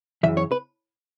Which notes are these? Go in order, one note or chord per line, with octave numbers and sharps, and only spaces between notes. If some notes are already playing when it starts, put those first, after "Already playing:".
F#2 C#3 E3 E5
C#5
B4